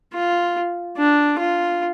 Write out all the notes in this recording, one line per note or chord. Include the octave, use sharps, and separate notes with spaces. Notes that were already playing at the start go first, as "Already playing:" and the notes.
F4
D4
F4